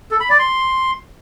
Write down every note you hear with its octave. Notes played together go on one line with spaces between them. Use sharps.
A4
B5
D5
C6